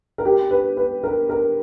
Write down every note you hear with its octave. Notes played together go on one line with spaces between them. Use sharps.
A#4
G4
B4
B4
A#4
A#4